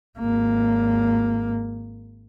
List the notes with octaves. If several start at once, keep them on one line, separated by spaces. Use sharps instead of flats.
G#1 A#3